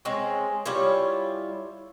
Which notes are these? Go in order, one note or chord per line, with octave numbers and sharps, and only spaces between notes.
G#3 C4 C#4
G3 E4 F4 C#5